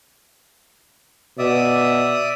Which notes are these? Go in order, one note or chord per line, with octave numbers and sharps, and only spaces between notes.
B2 D5 E5 D#6